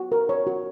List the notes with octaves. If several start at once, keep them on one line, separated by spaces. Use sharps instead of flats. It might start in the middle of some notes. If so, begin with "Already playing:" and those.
Already playing: F#4
A#4
C#5
F#4